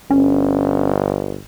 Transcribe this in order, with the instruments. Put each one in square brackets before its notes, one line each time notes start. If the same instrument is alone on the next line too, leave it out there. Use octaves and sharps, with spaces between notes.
[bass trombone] G1 [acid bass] C#4